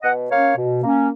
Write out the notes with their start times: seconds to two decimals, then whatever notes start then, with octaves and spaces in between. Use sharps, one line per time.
0.02 B2 D#5 F#5
0.30 A#3 C#4 C#5 F5
0.57 B2
0.83 A#3 C#4